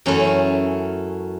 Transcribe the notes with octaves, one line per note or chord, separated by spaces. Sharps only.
F#2 E3 A3 C#4